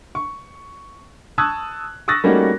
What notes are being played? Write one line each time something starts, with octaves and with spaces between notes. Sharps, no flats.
C#6
A5 C#6 D#6 E6 F#6 G#6
C#6 D#6 E6 F#6 A6 A#6
G3 A3 A#3 C#4 D#4 F#4